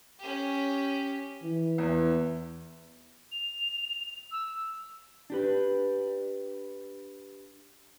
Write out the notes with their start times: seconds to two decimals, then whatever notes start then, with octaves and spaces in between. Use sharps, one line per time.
0.19 C#4 G4
1.42 E3
1.78 E2
3.32 F7
4.31 E6
5.30 D4 G4 B4